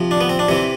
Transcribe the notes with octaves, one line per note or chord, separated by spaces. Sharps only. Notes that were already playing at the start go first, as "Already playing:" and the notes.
Already playing: C3 F3
D4
B3
C4
D4
C3 E3 C4